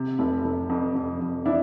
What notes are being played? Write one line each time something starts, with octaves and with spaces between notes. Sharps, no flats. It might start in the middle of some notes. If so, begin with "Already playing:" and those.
Already playing: C3
F1
F1
F2
F2
F2
D4 E4